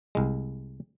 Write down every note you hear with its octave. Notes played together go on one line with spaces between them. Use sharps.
C2 G#3